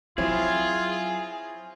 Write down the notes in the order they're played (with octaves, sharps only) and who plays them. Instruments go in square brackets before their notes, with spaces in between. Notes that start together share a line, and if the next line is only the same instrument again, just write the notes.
[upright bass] F#3 [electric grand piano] C4 E4 C#5 [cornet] F4 [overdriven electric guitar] G#4